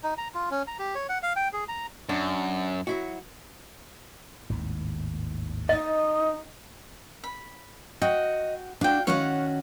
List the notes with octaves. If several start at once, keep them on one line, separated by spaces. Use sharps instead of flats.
D#4
A#5
F4
C#4
A#5
G4
C#5
F#5
F5
G5
G#4
A#5
F#2 D4
F#3 E4 F#4
G#1 D#2 A2
D#4 D#5
B5
F#4 D#5 G5
D4 F#4 F5 G5
D#3 C#4 F#4 C#5 F5 F#5